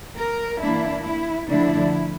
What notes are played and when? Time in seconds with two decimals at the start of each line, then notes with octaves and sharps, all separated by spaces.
0.16 A#4
0.60 E3 A#3 D4 E4
1.04 E4
1.48 D3 F3 A3 D4 E4